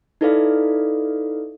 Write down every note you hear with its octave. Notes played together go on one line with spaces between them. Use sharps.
D#4 E4 A4 B4 D5 F5